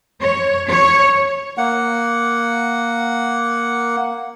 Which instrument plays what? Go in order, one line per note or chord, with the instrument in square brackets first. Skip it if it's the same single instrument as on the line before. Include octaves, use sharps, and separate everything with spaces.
[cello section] C#5
C#5
[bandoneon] A#3 F#5